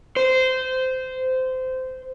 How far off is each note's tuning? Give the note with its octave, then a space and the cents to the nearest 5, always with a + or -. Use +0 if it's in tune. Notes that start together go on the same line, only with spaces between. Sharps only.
C5 -20